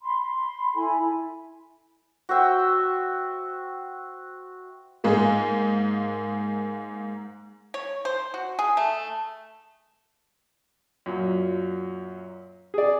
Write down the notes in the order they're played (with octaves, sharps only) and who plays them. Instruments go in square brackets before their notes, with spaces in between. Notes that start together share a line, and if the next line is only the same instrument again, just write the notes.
[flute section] B5 C6
B5 C6
E4 A4 G#5 B5
[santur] F#4 C5 E5 G5
[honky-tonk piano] G#2 G#3 A#3
[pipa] C#5
C5
F#4
G#4
A3
[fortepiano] F#2 A#2
G#4 D5